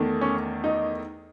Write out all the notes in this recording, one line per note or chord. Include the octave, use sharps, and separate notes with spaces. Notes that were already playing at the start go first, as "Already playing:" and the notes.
Already playing: E2 D#3 A3
C#4
D#4